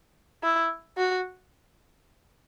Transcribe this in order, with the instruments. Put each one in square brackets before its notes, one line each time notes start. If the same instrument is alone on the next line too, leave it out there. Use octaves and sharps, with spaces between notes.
[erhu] E4
F#4